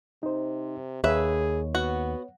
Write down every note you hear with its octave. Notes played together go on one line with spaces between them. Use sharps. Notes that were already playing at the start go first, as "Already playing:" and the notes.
C3 D#4 C5
D#2 G#4 B4 C#5 E5
B3 F#4